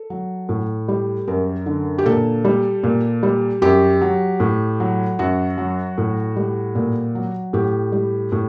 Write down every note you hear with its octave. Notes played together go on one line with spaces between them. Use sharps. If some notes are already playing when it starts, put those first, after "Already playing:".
Already playing: A4
F#3
A2
G3
F#2 A#4
D3
G4
A#2 A4
G3
A#2
G3
F#2 G4
F#3
A2
F#3
F#2 F#4
F#3
A2
G3
A#2
F#3
A2 G4
G3
A2